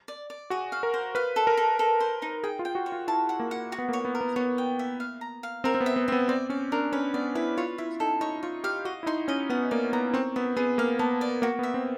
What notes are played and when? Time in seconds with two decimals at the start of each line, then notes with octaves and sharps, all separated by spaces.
0.08 D5
0.30 D5
0.50 F#4 G#4
0.72 F5
0.83 A#4
0.94 C5
1.15 B4 F5
1.36 A4
1.47 A#4
1.57 A4
1.79 A4
2.00 C5
2.22 D#4
2.43 G#4 G5
2.59 F4
2.65 G5
2.75 F#4
2.86 C#5
2.92 F4
3.08 E4 A5
3.29 F#5
3.40 A#3
3.51 F#5
3.72 F#4
3.79 B3
3.89 A#3
3.93 C#5
4.05 B3
4.15 A#4
4.21 B3
4.36 B3 C#5
4.58 G5
4.79 E5
5.00 F5
5.21 A#5
5.43 F5
5.64 C4 A#4
5.75 C4
5.81 B3
5.86 E5
5.96 B3
6.08 C4 E5
6.12 B3
6.29 C4 D5
6.50 C#4 D5
6.72 D4 A#4
6.92 C#4 B4
7.14 B3 D5
7.35 E4 B4
7.58 F4 C#5
7.78 E4 E5
8.00 D#4 A4
8.21 D#4 C#5
8.43 F4 C#5
8.64 G4 F5
8.85 F#4 D#5
9.03 E4
9.06 D#4 C6
9.28 C#4 D#5
9.50 B3 F#5
9.71 A#3 D5
9.93 B3 A#5
10.14 C4 C#5
10.36 B3 E5
10.57 B3 G#4
10.78 A#3 F5
10.99 B3 A5
11.21 D5
11.42 A#3 F#4
11.59 B3
11.63 E5
11.74 C4